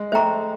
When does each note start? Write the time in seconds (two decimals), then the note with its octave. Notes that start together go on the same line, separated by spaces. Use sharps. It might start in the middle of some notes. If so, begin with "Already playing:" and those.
Already playing: G#3
0.12 A3 C5 E5 G5 A#5 C#6